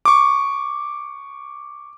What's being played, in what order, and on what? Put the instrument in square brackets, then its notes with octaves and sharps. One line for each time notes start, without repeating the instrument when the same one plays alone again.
[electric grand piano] C#6 D6